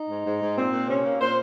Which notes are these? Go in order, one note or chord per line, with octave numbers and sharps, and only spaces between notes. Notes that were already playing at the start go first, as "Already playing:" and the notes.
Already playing: D#4
G#2
G#2
G#2
A#2 C4
A#2
C3 C#4
A#3
A#2 C5